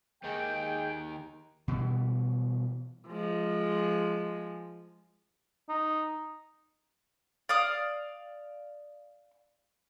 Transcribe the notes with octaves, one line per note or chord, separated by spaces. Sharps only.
D#2 D#3 G#3 G#4 G5
B2 E3 G3
F3 G#3
D#4
D5 F5 D#6